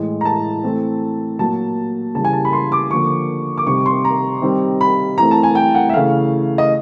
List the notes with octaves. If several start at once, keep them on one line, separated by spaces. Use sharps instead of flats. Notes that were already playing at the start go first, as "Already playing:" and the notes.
Already playing: A2 E3 G#3
A#5
A5
E3 A3 C4
A#2 F#3 A#3 A5
C#3 E3 G3 A5
G#5
A5
B5
C6
D6
D3 F3 A#3 C#6
D6
C3 D#3 G3 C#6
C6
A#5
D#3 G3 C4
B5
E3 A3 C4 A#5
A5
G#5
G5
F#5
E5
C#3 E3 A3 F5
D#5